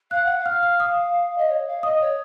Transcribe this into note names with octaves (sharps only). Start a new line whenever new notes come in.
F5 F#6
F#5
F5
F6
F6
D#6
D#5
C#5
F5
D#5 D#6
C#5